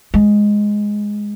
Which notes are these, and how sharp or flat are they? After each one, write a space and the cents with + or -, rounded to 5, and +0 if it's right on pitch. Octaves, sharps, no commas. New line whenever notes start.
G#3 +0